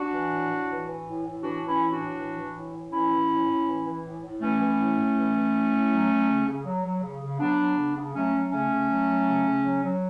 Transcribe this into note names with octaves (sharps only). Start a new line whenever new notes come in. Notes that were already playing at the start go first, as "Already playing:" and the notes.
Already playing: D4 F#4
E3
A2
A2
E3
E3
A2
A2
E3 D4 F#4
E3
C#4 E4
A2
D4 F#4
A2
E3
E3
A2
A2
E3 C#4 E4
E3
A2
A2
E3
E3
A2
A2
E3 A3 C#4
E3
A2
A2
E3
E3
A2
A2
F#3
F#3
C#3
C#3
F#3
F#3
C#3
C#3
F#3 B3 D4
F#3
C#3
C#3
F#3 A3 C#4
F#3
C#3 A3 C#4
C#3
F#3
F#3
C#3
C#3
F#3
F#3